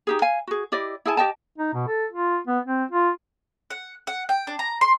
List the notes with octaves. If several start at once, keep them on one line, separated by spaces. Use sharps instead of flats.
D#4 G4 G#4
F5 G#5
F#4 G#4
E4 G4 D5 D#5
E4 G#4 G#5 A5
G4 D#5 G5 A5
D#4
B2
A4
F4
B3
C4
F4
F#5
F#5
G5
D4
A#5
C6